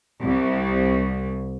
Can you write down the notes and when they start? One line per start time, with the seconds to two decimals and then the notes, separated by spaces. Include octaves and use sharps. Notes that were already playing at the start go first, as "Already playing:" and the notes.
0.23 C2